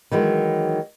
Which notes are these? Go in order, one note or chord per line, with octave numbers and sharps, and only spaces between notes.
D#3 E3 F#3 G#3